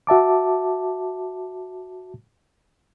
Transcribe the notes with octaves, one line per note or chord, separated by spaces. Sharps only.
F#4 E5 A5 D6